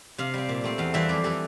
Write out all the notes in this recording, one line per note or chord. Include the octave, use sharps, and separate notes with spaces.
C3 F5
G3 C4
A#2
A3 C4
E2 F5
E3 G3 C4 E5
F2 D5
E3 G3 A4